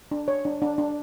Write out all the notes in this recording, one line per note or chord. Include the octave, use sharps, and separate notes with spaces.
D4
C#5
D4
D4
D4